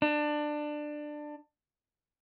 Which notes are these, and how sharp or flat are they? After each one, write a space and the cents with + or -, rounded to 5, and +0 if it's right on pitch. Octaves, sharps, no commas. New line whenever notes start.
D4 +20